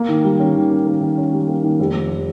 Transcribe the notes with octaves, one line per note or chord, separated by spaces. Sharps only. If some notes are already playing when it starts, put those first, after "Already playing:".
Already playing: A#3
D#3
G3
C#4
D#3
C#4
A#3
D#3
C#4
G3
A#3
D#3
F1
F1